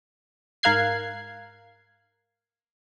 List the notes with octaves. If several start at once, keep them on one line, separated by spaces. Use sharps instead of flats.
G#2 A#4 F5 F#6 G#6 C7